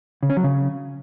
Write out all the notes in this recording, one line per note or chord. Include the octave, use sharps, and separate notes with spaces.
C#3
C#4
F#3
C#3